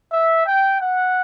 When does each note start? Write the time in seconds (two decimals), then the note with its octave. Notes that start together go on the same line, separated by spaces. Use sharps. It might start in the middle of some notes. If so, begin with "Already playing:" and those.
0.11 E5
0.47 G5
0.82 F#5